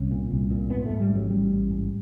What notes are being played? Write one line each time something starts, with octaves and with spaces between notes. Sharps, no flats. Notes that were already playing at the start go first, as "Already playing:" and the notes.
Already playing: C2 C#4
A#2
C2
A#2
G#2 B3
G#2 A3
G3
A1
F#3
A1 G3
A1
G#2